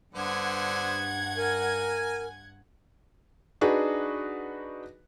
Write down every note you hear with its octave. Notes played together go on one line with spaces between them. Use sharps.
G2 D3 B3 C5 F#5 G#6
A#4 G#5
D4 D#4 F#4 G#4 B4